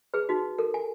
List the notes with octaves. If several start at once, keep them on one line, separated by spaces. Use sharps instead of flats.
G#4 B4
D#4 F#4
A4 A#4
G#5